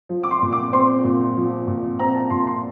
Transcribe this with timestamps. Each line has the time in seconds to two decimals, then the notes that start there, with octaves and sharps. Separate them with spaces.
0.09 F3
0.23 D6
0.31 C6
0.42 A#2
0.52 D6
0.73 C4 C6
1.04 A#2
1.37 F3
1.67 A#2
1.99 C4 A#5
2.15 A5
2.30 A#2 C6
2.47 C6